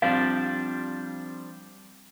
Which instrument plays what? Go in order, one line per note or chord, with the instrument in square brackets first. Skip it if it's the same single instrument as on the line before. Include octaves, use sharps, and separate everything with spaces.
[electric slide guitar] F3 G3 D4 [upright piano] C4 [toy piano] F5